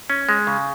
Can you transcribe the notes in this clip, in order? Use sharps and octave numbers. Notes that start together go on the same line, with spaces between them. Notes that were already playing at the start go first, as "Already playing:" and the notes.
C#4
G#3
C#3